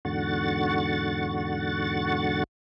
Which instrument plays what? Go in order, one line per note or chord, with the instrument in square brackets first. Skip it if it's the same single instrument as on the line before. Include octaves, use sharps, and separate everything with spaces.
[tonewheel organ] E2 G#2 D3 F#4 F#5 A6